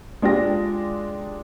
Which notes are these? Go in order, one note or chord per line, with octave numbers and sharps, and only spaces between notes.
G#3 D4 F4 G4 A#6